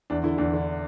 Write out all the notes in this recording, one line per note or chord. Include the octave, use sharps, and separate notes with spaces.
E2 D4
D3 E4
E2 D4
D3